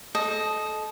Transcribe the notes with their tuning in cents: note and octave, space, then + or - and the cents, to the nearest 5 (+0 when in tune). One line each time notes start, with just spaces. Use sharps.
A4 -25 D#5 +0